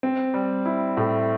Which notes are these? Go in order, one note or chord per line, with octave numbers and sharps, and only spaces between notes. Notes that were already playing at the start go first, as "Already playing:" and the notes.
C4
G3
E4
A2